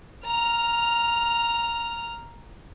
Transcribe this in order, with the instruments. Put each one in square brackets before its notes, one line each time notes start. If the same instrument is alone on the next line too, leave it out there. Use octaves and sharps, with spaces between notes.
[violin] A#5 F6